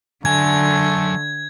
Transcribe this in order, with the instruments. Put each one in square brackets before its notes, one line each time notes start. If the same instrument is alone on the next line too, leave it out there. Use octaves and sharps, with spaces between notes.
[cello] D3 [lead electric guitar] F#3 G#5 [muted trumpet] A3 [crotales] G#6